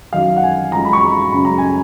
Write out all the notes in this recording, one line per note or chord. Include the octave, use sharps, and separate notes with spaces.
F#2 D#3 F#3 F5
F#5
G#5
F#2 F3 G#3 A#5
B5
C#6
A#5
B5
F#2 C#3 G#3 B5
A#5
G#5